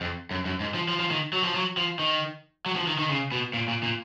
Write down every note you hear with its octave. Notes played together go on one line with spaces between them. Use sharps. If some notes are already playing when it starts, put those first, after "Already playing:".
F2
F#2
F#2
G#2
F3
F3
F3
D#3
F#3
F3
F#3
F3
D#3
F#3
F3
D#3
D#3
C#3
B2
A#2
A#2
A#2